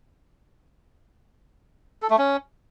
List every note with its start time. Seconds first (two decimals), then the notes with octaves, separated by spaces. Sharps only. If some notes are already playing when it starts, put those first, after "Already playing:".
2.02 A4
2.10 A3
2.18 C#4